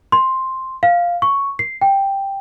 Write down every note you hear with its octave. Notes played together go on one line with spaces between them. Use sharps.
C6
F5
C#6
C7
G5